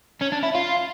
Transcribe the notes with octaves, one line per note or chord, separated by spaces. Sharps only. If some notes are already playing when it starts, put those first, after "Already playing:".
C#4
D4
E4
F4